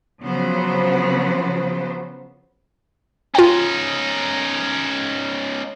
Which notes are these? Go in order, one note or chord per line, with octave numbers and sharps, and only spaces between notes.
C#3 F3 F#3 B3 C5
C#4 D#4 F4 G5